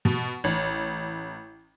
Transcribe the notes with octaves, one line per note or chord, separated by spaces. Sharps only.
B2
A1